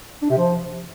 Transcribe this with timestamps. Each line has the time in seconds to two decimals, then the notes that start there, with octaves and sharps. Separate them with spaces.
0.22 D4
0.30 C3
0.37 F3